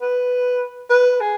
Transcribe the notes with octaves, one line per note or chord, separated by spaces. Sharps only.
B4
B4
G#4